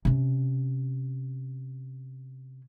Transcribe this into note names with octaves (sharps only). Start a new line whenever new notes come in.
C3 C#4